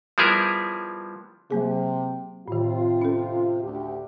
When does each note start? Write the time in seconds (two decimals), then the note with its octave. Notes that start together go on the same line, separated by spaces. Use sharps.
0.18 F3 G3 B3 E4 G#4 A#4
1.51 C3 F#3 A#3 G#4
2.48 A2 C3 D#3 C4 F4
3.02 C#4 A4
3.63 D2 G4